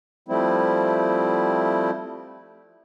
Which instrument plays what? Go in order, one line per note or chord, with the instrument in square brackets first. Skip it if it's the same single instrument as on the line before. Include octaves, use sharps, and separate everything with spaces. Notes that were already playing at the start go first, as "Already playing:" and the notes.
[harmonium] F3 G3 A3 C4 E4